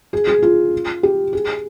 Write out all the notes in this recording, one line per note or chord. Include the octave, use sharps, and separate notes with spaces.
G#4
G#4
F4
G4
G#4